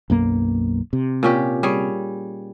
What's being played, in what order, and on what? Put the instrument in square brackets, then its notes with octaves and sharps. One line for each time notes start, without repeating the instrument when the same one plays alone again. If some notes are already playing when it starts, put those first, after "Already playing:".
[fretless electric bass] B1 F#2 A#3
C3
[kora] A#2 C#4 G4
G3 G#4 C#5